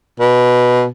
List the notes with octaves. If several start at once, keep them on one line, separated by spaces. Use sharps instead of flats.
B2